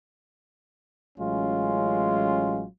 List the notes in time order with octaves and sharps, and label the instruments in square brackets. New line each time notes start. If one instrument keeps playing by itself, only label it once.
[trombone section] A1 F#3 G#3 C#4 F4